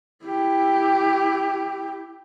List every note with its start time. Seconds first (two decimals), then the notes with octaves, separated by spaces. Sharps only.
0.25 E4 G4